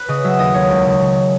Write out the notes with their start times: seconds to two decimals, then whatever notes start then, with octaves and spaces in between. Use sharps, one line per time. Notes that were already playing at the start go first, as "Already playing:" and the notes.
Already playing: B4
0.08 C#3 D#5
0.24 F#3 E5
0.39 D#2 D#5
0.54 D#2 C#5
0.70 C#2
0.85 C#3
1.01 C#3